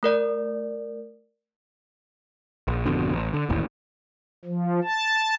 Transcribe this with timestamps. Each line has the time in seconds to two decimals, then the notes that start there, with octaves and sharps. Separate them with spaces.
0.03 A3 A#4 D5
2.68 A#1
2.85 G#1 F2 B2 D3
3.13 A1
3.34 D3
3.49 E1 A1 D#2 E3
4.45 F3
4.84 A5